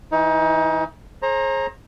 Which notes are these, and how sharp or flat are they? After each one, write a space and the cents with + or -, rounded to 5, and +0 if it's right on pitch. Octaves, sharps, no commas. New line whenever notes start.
E3 +0 D#4 +30
G#4 +20 C5 +45 A#5 +0